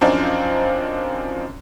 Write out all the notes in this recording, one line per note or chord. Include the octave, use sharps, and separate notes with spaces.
F#2 F3 C4 D4 D#4 F4